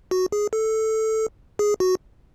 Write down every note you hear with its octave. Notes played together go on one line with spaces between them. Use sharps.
F#4
G#4
A4
G#4
F#4